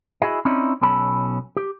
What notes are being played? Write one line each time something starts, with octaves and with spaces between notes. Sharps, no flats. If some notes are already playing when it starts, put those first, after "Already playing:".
E4 F#4 G#4 D#5
C4 C#4 D#4 E4 D5
B1 B2 C#4 A4 B5
G4